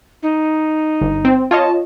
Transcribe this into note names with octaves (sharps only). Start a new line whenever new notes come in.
D#4
G1
C4
F4 C#5 D#5 A5